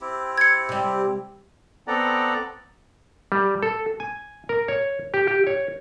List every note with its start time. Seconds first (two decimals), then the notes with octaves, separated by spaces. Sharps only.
0.01 C4 E4 G4
0.38 G#6 C#7
0.69 C3 G3
1.87 B3 C4 A4 D5 F#5 A#5
3.32 G3
3.63 A4
4.00 G#5
4.49 A#4
4.68 C#5
5.14 G4
5.28 G4
5.47 C#5